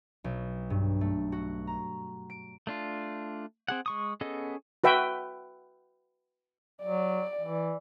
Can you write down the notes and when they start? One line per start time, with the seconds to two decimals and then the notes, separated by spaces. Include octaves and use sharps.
0.24 B1
0.70 G2
1.01 A3
1.32 F#4
1.67 A#5
2.30 D7
2.67 A3 D4 F4
3.68 C4 G#4 F#5
3.86 G#3 C#6 D#6
4.21 B3 C#4 G#4 A4 D#5
4.84 F#4 B4 E5 G5
6.82 F#3 D5
7.41 E3